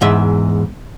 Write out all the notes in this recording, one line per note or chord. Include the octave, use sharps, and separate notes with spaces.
E2 G#2 E5